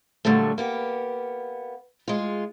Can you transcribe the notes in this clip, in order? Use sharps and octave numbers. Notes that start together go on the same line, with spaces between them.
A#2 D3 F#3 G3 A3
A#3 B3 G4
G#3 F4